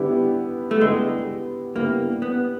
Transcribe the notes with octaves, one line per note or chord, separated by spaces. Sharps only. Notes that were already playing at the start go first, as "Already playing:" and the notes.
Already playing: D3 G3 B3 E4 G4
A3
D3 G3 G#3 B3 E4 G4
D3 G3 A#3 B3 E4 G4
B3